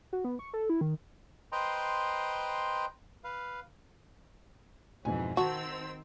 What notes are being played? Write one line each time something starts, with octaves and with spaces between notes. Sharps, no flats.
F#4
B3
C#6
A4
E4
D#3
B4 C5 D#5 G5 A#5 C6
B4 F5
F2 G#2 B2 E3 G#5
D#3 C4 F#4 A5 E6